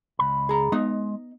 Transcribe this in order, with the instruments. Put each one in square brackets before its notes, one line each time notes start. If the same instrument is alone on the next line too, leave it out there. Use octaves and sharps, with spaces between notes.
[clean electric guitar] C#2 B5
[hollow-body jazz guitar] G#4 A#5
[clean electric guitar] G#3 [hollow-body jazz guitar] B3 D#4 D#5